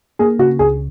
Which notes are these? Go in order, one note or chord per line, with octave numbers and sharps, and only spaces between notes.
A#3 G#4
C#3 F#4
C#2 G#4